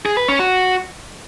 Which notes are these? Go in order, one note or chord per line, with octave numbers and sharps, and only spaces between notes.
G#4
B4
C#4
F#4